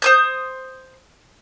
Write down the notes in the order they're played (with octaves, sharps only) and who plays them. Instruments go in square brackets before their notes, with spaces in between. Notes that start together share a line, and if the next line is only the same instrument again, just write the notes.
[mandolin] C5 D#6 G6